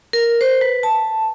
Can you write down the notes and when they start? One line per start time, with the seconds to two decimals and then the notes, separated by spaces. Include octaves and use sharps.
0.13 A#4
0.41 C5
0.61 B4
0.83 A5